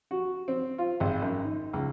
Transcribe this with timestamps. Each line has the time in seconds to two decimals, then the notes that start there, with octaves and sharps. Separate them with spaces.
0.11 F#4
0.48 C4
0.78 F4
1.00 G#1
1.22 F#2
1.44 D#4
1.73 C#2